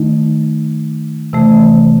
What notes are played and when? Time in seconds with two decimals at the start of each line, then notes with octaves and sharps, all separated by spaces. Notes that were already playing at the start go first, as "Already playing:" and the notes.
Already playing: D#3 A3 D#4
1.33 C3 E3 A3